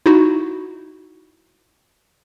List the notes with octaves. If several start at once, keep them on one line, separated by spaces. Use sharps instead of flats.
D#4 E4 F#4